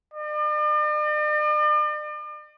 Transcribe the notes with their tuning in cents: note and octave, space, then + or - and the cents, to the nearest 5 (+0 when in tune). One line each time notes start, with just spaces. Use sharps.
D5 +45